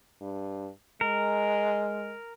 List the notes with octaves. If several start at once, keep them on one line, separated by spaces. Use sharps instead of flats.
G2
G#3 A#4